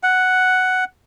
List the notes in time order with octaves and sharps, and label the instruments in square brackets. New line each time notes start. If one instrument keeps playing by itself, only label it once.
[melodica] F#5